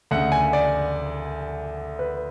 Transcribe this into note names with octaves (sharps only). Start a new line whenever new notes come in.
D2 C#3 F#5
G#5
D5
B4